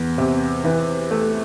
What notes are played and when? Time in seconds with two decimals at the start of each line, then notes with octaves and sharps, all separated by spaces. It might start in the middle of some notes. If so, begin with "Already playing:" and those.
Already playing: E2
0.18 C3
0.64 E3
1.11 A3